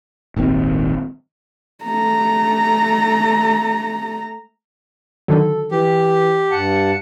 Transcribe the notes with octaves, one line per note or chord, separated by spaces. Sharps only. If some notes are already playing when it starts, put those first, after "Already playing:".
D#1 G#1 D#2 C4
A3 A#5
D3 D#3 F#3 A4
E3 G4
G2 F#5 A5 C#7